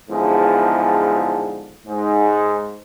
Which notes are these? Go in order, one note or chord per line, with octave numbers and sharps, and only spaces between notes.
E2 G#2 D3 F3
G#2